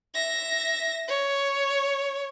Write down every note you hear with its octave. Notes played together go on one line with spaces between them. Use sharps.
E5 A#6
C#5